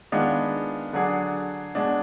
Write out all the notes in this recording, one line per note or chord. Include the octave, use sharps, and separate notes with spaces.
D#3 G#3 B3 D4 F4
D3 F#3 D4 G#4
B2 G#3 D4